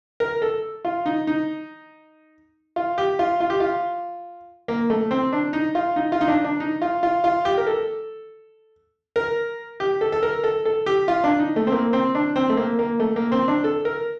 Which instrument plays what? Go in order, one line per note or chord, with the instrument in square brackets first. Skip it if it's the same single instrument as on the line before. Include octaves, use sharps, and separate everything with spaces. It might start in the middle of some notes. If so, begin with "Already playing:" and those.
[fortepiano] A#4
A4
F4
D#4
D#4
F4
G4
F4
F4
G4
F4
A#3
A3
C4
D4
D#4
F4
D#4
F4
D#4
D4
D4
D#4
F4
F4
F4
G4
A#4
A4
A#4
G4
A4
A4
A#4
A4
A4
G4
F4
D4
D#4
A3
C4
A#3
C4
D4
C4
A3
A#3
A#3
A3
A#3
C4
D4
A4
A#4